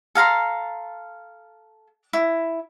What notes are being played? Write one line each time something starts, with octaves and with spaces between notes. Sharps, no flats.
A4 F5 A#5 C6
E4